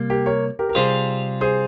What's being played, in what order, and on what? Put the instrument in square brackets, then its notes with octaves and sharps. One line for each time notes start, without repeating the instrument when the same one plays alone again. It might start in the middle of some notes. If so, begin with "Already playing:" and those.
Already playing: [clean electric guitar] C3 G3 A#3
[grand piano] G4 A#4
A#4 C#5
G4 A#4
A#4
[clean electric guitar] C3 G3 C4 F4 [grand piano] G#4 C5
[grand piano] G#4 C5